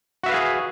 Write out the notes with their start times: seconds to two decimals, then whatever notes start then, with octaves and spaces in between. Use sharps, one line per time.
0.23 F#4
0.26 E5
0.29 B4
0.31 F5
0.34 G#4